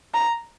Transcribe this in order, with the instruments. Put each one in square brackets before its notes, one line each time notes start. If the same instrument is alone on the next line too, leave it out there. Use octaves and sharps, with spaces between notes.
[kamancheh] A#5